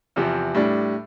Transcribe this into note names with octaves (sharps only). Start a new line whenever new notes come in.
E2 C3 F3
A2 G3 D4